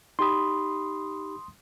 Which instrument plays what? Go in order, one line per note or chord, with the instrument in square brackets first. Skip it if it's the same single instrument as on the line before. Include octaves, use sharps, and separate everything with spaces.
[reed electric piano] D#4 G4 B5 [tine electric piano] C6 D#6